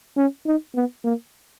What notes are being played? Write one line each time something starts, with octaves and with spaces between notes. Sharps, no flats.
C#4
D#4
B3
A#3